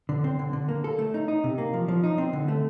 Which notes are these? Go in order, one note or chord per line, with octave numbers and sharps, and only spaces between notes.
D3
C4
D3
D3
A#3
A4
A3
D#4
D#4
C3
A#3
F3
F3
D#4
C4
D3
A3